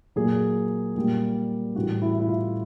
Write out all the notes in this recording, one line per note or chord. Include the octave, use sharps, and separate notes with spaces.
A#2 F#3 G#4
A#2 G3
A2 E3 G3 F#4
E4
E4
F4